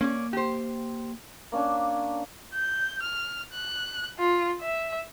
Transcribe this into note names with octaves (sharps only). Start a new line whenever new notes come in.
A#3 C#4 D5
G4 C5
A#3 C#4 D4
G6
F6
F#6
F4
E5